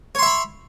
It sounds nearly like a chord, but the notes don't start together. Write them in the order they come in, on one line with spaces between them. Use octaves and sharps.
C#5 C6 E5 B5